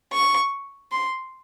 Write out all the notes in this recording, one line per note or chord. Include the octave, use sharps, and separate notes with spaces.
C#6
C6